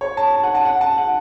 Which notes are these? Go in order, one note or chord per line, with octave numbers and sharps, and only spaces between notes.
C#5
A5
A5
F#5
A5
F#5
A5
F#5